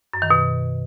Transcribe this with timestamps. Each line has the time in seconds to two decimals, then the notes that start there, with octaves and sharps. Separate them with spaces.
0.13 F#2
0.22 D#3
0.31 B2